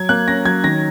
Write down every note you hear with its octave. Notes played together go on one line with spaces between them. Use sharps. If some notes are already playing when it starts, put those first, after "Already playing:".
Already playing: F#3 G#6
A#3 F#6
C#4 A#6
F#3 G#6
D#3 A#6